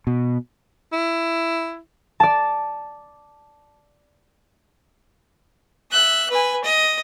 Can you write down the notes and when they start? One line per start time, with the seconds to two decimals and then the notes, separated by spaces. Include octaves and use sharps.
0.07 B2
0.92 E4
2.20 D5 A5
5.91 E5 F#6
6.30 B4 G#5
6.64 D#5